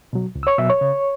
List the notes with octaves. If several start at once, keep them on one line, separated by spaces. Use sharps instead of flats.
B2 F#3
C#2
E6
C#5 C#6
B2 F#3 E5 E6
C#5 C#6
C#3